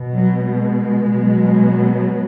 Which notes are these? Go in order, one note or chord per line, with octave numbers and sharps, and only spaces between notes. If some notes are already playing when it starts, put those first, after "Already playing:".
Already playing: B2
F#3
G#3
B2 F#3